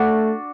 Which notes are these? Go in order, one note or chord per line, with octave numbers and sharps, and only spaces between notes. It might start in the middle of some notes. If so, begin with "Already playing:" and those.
Already playing: A3 D4 F#4 D5